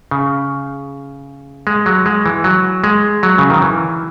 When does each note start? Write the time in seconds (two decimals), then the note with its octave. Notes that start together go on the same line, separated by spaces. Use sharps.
0.11 C#3
1.67 G#3
1.86 F#3
2.06 G#3
2.26 E3
2.44 F#3
2.84 G#3
3.23 F#3
3.38 C#3
3.50 D#3
3.62 E3